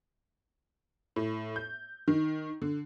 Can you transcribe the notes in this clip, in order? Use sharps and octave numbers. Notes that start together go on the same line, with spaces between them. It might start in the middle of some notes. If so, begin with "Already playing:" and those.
A2
G6
D#3
D3